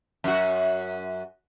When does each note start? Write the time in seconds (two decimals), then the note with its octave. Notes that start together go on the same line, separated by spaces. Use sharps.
0.24 F#2 F#4